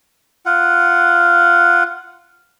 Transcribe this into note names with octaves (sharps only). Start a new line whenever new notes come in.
F4 F#5